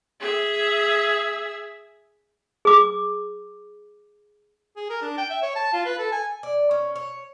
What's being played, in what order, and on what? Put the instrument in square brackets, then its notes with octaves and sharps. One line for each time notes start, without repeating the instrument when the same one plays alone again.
[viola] G#4 E5
[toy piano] G#4 D6
[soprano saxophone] G#4
A#4
D4
G5
E5
C#5
A5
F4
B4
A4
G#5
[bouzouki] D5
C#4
C#5